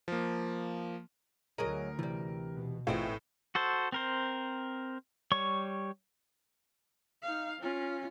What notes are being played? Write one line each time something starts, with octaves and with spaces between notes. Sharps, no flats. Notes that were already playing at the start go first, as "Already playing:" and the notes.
F3 A#3
D2 F#3 G#4 A#4 D#5
C3 E3 G3
B2
A1 A2 B3 C4 F4 G#4 D#5 F5
F#4 A4 C5
C4 A#4 C5
G3 C#5 C#6
D#4 F5
C#4 F4